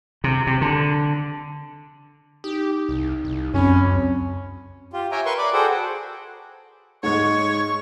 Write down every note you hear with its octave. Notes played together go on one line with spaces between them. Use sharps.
C3
C3
D3
D#4 G4
C2
C2
C#2 F#2 C4 C#4 C#5 B5
F4 G4
C#5 E5 G5 G#5 A#5
A#4 B4 C6 C#6
D5 B5 D6
F#4 G#4 A4 C5 F#5 G5
G#2 G#3 C#5 C#6